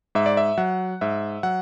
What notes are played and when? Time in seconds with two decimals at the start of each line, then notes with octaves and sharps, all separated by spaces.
0.15 G#2 E5
0.26 D5
0.37 E5
0.58 F#3 F#5
1.01 G#2 E5
1.43 F#3 F#5